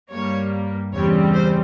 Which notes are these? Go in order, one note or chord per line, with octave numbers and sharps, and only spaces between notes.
G2 G3 A#3 C#5
E2 C#3 G3 C4 C#5
C5